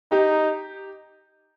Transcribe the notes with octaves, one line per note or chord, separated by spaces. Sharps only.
D#4 G4